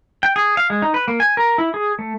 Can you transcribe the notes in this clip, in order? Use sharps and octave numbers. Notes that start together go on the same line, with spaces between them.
G5
G#4
F5
G#3
D#4
B4
A#3
G#5
A#4
E4
G#4
A3